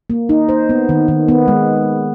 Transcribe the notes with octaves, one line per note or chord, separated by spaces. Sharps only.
A#3
D#4
C5
B3
D#3
D#3
B3
G#3